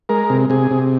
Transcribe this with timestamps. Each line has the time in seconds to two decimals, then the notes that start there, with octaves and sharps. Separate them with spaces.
0.09 G#3 A#4
0.30 C3
0.50 C3 G#4
0.71 C3